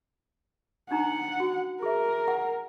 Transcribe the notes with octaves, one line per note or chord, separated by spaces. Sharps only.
D4 D#4 F#5 A#5
F#4
G#4 A#4 E5
F#5